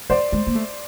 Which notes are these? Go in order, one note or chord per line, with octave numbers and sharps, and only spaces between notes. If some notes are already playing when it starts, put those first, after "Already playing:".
G3 C5 D5
G#3
A#3
A3